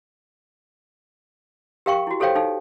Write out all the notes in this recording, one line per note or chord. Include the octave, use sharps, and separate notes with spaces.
G4 A#4 F5 G5 C#6
E4 F#4
G4 A4 C5 C#5 F5 G5
D#4 A4 F5